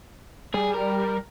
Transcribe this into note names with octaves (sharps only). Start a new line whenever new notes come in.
G3 G#4
A#4